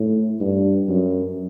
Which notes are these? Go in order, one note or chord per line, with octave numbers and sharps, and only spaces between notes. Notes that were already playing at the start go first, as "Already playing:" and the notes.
Already playing: A2
G2
F#2